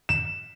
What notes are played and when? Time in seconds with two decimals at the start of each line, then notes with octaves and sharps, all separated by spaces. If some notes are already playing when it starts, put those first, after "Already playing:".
0.09 E7